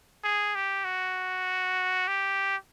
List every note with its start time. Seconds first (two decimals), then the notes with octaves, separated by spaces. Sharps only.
0.24 G#4
0.55 G4
0.85 F#4
2.08 G4